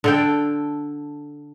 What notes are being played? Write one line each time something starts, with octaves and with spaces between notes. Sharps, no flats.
D3 A4 G5